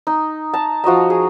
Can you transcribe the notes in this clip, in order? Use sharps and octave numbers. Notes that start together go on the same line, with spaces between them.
D#4
A5 A#5
F3 F#4 D#5 A#5
G#4